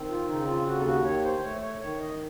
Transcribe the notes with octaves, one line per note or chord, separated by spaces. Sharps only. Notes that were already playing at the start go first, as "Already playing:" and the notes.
Already playing: D#3 C4
F4
C#3 D#4
F4
D#2 F#4
A4
F#4
D#3 C#5
C5
A3 C#5
C#5
D#3 C#5
D#5